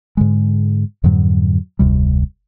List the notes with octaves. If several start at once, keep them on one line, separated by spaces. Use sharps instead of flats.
G#2 D3 G#3
F2 G#2 D3 F#3
F1 D2 C3 G3